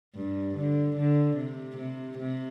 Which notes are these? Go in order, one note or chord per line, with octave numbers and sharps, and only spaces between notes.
G2
D3
D3
C3
C3
C3